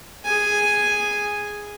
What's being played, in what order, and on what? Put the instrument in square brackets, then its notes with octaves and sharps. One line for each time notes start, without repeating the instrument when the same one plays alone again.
[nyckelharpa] G#4 G#5